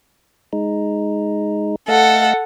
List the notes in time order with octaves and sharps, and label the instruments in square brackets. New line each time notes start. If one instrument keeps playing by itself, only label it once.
[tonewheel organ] G#3 D#4
[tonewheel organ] A3 D#5 F5 [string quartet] A4 F#5